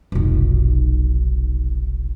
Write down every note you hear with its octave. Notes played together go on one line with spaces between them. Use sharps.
F1 B1